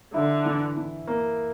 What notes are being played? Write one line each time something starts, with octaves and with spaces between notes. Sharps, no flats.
D3 E4
E3
E3
A#3